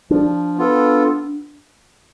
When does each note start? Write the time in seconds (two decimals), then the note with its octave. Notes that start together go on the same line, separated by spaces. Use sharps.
0.11 F3 D4
0.58 B3 F4 A4